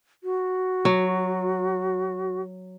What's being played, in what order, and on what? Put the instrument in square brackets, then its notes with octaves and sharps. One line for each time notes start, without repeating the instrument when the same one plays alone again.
[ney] F#4
[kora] F#3